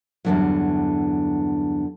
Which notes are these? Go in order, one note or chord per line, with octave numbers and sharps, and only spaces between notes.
E2 G2 B2 D3 E3 F#3